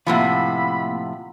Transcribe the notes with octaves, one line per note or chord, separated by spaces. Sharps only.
A2 C3 F3 A#3 F5 F#5 B5